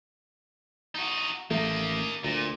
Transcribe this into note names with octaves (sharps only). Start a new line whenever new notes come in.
D#4 F#4
A1 A3 A#3 D#4
D2 A#2